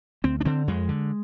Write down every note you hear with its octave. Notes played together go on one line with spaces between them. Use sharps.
D2 C4
D4
D3 C4
F2 G#3
D3